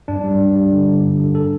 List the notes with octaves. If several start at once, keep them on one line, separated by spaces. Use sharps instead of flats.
G2 D4
G3
G2
G3
D3
D3
G2
D3
A4